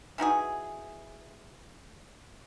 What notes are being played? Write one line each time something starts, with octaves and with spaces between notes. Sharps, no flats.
E3 D#4 F#4 G#4